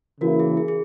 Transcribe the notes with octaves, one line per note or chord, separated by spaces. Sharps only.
C#3 E3 A#3 E4 F#4 A#4
G#4
G#4
G#4